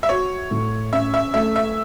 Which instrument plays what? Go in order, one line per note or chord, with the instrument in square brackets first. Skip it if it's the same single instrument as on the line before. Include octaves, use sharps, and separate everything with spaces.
[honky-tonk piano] E5
[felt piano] F#4 [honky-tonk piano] C#5
[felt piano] A2
[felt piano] C#4 [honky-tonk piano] E5
[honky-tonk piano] E5
[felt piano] A3 [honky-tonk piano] E5
[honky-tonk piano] E5